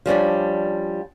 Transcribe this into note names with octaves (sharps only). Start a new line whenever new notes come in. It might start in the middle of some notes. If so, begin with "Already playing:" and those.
F3 G3 C#4 D4